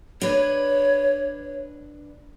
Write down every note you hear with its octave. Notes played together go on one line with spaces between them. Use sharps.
D4 B4 C#5